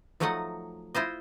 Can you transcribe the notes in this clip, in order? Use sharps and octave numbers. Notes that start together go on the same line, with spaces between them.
F3 F#3 A3 D#4 D#5 F#5
E4 F4 C5 D#5